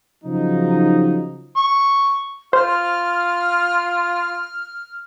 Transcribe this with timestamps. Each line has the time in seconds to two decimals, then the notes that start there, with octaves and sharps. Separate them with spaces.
0.24 C#3 F3 F#3 D#4
1.57 C#6
2.53 F4 C5 F6